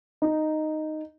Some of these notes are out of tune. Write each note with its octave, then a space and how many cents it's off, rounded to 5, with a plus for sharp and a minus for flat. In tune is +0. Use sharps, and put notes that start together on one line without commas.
D#4 -5